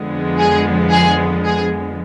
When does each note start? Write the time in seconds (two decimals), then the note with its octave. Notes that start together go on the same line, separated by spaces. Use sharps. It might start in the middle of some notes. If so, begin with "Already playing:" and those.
Already playing: F2 D3 F3 G#3 B3
0.39 G#4
0.91 G#4
1.44 G#4